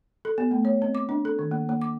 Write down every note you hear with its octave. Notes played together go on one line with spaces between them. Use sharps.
A4
B3
A3
C#5
C4
D6
D4
A4
D#3
A#3
A#3
D6